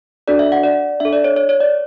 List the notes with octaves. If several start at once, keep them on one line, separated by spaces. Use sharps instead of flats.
D4 F#4 A4 D5
E5
F#5
D5
D4 A4 E5
D5
C#5
C#5
C#5
D5